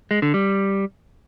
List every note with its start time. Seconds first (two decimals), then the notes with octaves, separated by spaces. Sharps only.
0.11 G#3
0.22 D3
0.34 G3